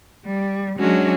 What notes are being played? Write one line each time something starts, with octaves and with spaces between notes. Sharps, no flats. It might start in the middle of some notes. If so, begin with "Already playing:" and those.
G3
F#3 G#3 C#4 D4 F#4